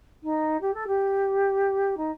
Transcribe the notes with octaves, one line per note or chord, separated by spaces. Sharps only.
D#4
G4
A4
G4
D#4